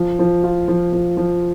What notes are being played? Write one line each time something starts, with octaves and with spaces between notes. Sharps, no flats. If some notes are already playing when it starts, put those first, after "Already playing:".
Already playing: F3
F3
F4
F3
F3
F3